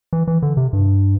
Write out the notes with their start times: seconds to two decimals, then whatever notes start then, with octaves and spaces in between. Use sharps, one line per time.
0.13 E3
0.28 E3
0.42 D3
0.57 C3
0.73 G2